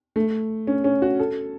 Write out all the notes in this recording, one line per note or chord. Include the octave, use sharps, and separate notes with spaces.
A3
C#4
C#4
F#4
A4